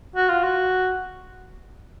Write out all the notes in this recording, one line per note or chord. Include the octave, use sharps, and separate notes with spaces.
F#4
F4
F#4